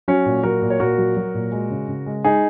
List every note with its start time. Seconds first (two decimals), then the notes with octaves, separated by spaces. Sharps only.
0.08 F#3 C#4 F#4
0.26 A#2
0.43 F#3 F#4 A#4
0.62 A#2
0.70 C#5
0.80 A#2 F#4 A#4
0.98 F#3
1.17 F#3
1.34 A#2
1.52 G#3
1.70 C#3
1.88 C#3
2.06 G#3
2.24 G#3 D#4 G#4